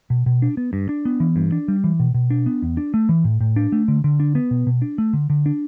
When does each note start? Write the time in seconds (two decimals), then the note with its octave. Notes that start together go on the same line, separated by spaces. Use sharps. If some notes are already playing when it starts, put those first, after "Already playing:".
0.10 B2
0.26 B2
0.42 D4
0.57 B3
0.73 G2
0.89 D4
1.05 B3
1.20 E3
1.36 G2
1.52 D4
1.68 G3
1.84 E3
2.00 B2
2.14 B2
2.30 D4
2.46 B3
2.62 E2
2.77 D4
2.94 A3
3.09 E3
3.25 A2
3.41 A2
3.56 D4
3.72 A3
3.88 D3
4.04 D3
4.20 D4
4.35 B3
4.51 B2
4.67 B2
4.82 D4
4.98 A3
5.13 D3
5.30 D3
5.46 D4